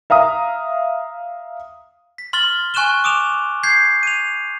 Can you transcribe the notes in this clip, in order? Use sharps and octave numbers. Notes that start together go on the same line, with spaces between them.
E5 F5 A#5 D#6
B6
C6 F6 A6 G7
G#5 C#6 F#6 D#7 E7 G7
D6 D#6 D7 E7 F7
G6 G#6 C7
D#7 F7